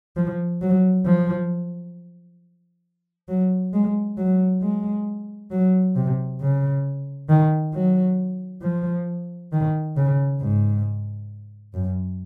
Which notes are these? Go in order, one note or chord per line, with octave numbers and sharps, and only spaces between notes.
F3
F#3
F3
F#3
G#3
F#3
G#3
F#3
C3
C#3
D#3
F#3
F3
D#3
C#3
G#2
F#2